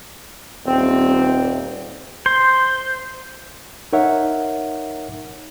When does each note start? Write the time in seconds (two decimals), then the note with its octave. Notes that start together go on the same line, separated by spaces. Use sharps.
0.65 D#1 C4
2.26 C5
3.93 D#4 A#4 C#5 E5 F#5